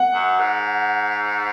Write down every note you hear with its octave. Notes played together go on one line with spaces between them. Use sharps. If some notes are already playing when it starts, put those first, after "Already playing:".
Already playing: F#5
F#2
G#2